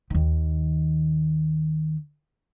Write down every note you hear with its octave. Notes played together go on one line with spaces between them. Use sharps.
D#2 D#3